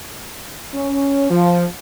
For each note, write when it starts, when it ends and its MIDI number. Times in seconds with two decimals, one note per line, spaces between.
0.74 1.27 61
1.30 1.64 53